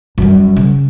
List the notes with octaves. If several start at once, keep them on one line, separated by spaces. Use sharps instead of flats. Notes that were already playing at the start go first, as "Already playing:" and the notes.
F#2 G3
C#3